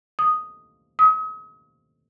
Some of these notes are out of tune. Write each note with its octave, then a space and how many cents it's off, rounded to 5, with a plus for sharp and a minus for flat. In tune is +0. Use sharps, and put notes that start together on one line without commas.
D#6 +0
D#6 +40